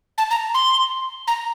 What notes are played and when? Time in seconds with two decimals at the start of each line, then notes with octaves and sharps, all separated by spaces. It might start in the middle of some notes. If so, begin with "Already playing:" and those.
0.18 A5
0.31 A#5
0.54 C6
1.28 A#5